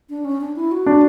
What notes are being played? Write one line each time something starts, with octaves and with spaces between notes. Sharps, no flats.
D4
C#4
D4
E4
F#4
D4